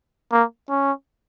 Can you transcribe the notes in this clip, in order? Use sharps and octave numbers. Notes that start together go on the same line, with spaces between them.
A#3
C#4